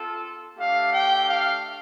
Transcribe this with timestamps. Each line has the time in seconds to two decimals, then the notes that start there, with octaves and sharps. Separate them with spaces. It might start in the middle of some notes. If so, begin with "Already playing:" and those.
Already playing: C4 F4 A4
0.57 A3 D4 G4 F5
0.91 G5
1.26 F5